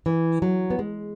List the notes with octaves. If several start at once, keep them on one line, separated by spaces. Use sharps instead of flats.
E3
F#3
B3
G#3